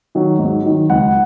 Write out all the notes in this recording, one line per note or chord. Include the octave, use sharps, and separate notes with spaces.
D#3 F#3
G#2
D#3 F#3
C#2 F#5